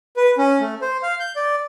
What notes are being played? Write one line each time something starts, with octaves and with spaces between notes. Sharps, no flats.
B4
C#4
A3
C5
F5
G6
D5